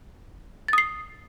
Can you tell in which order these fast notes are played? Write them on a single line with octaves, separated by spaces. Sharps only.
A6 D#6 C7